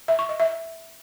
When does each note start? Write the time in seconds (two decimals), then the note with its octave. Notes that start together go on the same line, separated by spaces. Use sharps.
0.08 E5
0.19 C#6
0.29 D#5
0.40 E5